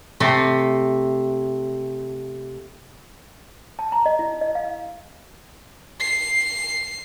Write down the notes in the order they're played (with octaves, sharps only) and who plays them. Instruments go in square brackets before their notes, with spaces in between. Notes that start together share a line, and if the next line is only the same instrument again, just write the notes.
[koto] C3 A3
[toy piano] A5
A#5
D#5
E4
D#5
F5
[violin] C7